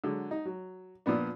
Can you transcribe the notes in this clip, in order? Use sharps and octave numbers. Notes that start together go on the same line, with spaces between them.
D3 F#3 G#3
D#4
F#3
A#2 F3 B3 D4